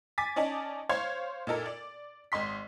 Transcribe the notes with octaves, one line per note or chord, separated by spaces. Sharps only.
G#5 D6 A6 B6
C#4 D#4 D5 D#5 G#5 A5
C5 C#5 F5 C6 G#6
A#2 D#4 A4 A#4
D5
G#1 D#5 C6 B6